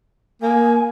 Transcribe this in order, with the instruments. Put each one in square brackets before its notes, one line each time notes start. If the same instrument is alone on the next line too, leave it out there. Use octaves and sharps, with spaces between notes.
[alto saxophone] A#3 [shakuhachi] G#5